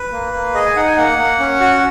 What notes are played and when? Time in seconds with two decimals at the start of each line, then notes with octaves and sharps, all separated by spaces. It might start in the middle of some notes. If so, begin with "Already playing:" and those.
Already playing: B4
0.12 A#3
0.33 A#3
0.54 G#4 D#5
0.65 G#5
0.76 D#4 F#5
0.86 G#5
0.97 A#3 F#5
1.18 A#3
1.40 C#4
1.60 F#4